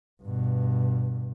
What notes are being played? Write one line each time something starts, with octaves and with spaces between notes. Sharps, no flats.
G2 B2